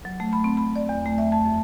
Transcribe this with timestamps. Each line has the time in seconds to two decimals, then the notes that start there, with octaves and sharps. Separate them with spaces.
0.05 F#3
0.20 A3
0.33 B5
0.44 C4
0.57 B5
0.76 D5
0.89 E2
1.06 A3
1.18 E5
1.32 A5
1.45 F#2